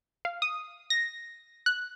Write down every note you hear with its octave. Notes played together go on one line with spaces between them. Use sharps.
F5
D#6
A#6
F#6